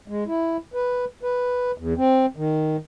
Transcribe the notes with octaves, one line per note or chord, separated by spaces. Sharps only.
G#3
E4
B4
B4
E2
C4
D#3